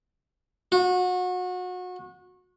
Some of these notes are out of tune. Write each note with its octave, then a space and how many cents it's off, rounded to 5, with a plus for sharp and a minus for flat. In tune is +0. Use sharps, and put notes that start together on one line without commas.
F#4 -30